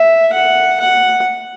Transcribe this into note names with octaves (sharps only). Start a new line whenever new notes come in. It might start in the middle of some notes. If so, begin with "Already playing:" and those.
Already playing: E5
F#5
F#5